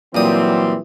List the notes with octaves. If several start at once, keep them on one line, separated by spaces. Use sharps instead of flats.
A#2 E3 F#3 G3 C4 D#6